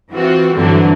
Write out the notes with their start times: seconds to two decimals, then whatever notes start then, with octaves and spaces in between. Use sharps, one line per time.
0.11 E3 C4 F4 F#4
0.56 G2 D3 E3 F#3 C4